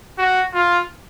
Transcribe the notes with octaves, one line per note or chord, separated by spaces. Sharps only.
F#4
F4